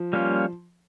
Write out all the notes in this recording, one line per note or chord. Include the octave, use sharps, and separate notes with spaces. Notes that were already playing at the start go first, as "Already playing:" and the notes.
Already playing: F3
G3 A#3 C#4 F4